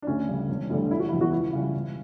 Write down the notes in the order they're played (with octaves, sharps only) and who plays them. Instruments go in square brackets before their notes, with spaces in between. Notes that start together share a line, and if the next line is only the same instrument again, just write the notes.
[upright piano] D4
D2 C#4
C#3 G3
E1
D2 D3 G3
E1 E4
F#4
E4
E2 B2
F#4
C#2 E4
C#3 G3
E1